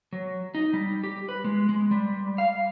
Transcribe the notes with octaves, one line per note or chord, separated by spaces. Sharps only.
F#3
D#4
G3
G4
B4
G#3
G#3
G3
F5